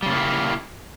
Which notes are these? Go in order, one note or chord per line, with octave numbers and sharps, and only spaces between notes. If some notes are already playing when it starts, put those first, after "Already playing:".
C#3 G3 A#3 E4 G4